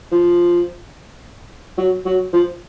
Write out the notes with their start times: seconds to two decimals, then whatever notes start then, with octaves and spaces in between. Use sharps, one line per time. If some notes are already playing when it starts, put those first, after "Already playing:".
0.12 F3
1.78 F#3
2.06 F#3
2.33 F3